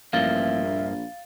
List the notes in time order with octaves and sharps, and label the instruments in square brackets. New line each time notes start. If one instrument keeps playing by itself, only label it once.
[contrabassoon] A1 [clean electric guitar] G2 F3 A#3 [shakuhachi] E5 [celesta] F5 A6 G7
[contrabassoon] A#1